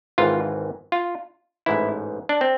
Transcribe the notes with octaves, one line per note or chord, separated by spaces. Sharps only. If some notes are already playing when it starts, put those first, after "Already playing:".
G#1 G#2 E3 F4
F4
A1 G#2 E3 E4
D4
C4